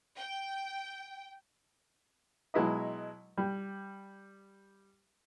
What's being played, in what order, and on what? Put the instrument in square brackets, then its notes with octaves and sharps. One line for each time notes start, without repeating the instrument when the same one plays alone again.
[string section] G5
[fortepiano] B2 F#3 G#3 E4 B4 D#5
G3